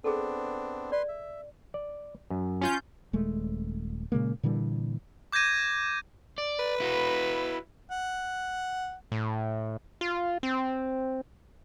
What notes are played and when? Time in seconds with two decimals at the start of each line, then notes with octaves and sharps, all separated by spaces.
0.04 B3 C4 D4 G#4 A4
0.92 B4 D5 C6
1.08 E5
1.74 D5
2.30 F#2
2.61 C#4 F4 G6
3.13 D#1 G#3 A3
4.12 A#2 C#3 G#3 A#3
4.43 A#2 D3 E3 G3
5.32 D6 G6 G#6 A#6 D#7
6.38 D5
6.59 B4
6.80 E4 F#4
7.91 F#5
9.12 A2
10.01 F4
10.43 C4